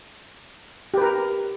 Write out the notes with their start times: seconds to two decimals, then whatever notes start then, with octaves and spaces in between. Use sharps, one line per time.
0.94 G4
0.98 B4
1.01 A#4